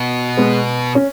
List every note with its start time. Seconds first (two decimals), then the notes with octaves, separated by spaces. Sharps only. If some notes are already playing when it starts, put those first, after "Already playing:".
Already playing: B2
0.37 G#3 B3
0.95 C#4